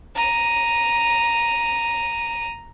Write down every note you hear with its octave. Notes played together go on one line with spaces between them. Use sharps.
A#5 D#7